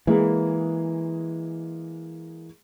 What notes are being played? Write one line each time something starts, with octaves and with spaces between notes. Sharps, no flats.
E3 G#3 A#3 G#4